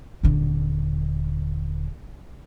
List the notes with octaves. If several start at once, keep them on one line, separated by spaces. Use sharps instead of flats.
D#1 D3